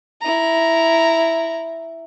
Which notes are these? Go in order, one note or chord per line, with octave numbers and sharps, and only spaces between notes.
E4 A#5